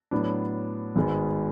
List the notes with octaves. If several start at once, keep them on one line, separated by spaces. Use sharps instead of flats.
A2 F#3 B3 D4
G#1 G#2 G#3 B3